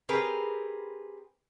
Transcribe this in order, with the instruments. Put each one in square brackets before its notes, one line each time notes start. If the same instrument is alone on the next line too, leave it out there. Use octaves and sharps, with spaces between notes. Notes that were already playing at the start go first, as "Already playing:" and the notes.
[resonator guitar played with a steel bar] C4 G4 G#4 A#4 B4